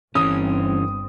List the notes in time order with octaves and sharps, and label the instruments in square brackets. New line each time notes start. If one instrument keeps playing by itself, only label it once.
[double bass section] G1 C4 [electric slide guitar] E3 C#4 [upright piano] D#6